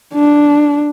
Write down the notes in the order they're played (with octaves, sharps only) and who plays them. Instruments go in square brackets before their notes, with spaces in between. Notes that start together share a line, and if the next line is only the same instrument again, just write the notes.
[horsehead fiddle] D4